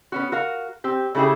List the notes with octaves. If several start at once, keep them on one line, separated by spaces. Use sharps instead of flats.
B3 C#4 F#4
F#4 A#4 F5
C4 G4
C#3 A3 E4 G4 G#4